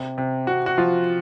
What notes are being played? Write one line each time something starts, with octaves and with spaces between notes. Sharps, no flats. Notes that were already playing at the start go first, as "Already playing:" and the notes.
Already playing: C3
C3
C3 F#4
F#4
F3 F4